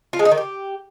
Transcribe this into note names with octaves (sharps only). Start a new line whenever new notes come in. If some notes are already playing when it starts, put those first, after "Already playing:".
F4
G#3
D#4
D#3
G4